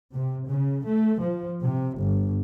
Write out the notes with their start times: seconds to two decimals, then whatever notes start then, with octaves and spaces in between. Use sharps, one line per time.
0.14 C3
0.49 C#3
0.86 A3
1.21 F3
1.64 C3
1.99 G1